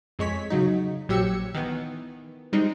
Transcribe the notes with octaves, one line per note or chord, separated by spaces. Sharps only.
F2 G#3 C#5 B6
C#3 F#3 D#4
A#1 F#3 G4 E6 G#6 C#7
D#3 E3 B3
G3 G#3 C4 D#4